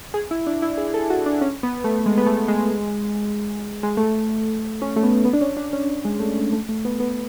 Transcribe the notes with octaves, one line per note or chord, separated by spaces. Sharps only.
G#4
E4
D4
E4
G#4
A4
F#4
D4
C#4
B3
A3
G#3
B3
A3
G#3
G#3
A3
C#4
A3
B3
B3
D4
C#4
D4
C#4
G#3
A3
A3
A3
A3
B3
B3